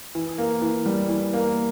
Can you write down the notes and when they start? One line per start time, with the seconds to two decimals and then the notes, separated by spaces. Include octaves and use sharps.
0.15 E3
0.38 A#3
0.62 E3
0.86 G3
1.09 E3
1.34 A#3